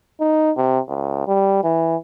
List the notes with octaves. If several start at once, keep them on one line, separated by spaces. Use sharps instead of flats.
D#4
C3
C#2
G3
E3